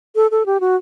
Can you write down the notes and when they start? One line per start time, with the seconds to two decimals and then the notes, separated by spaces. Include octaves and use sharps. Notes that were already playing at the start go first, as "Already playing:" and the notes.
0.16 A4
0.31 A4
0.46 G4
0.60 F#4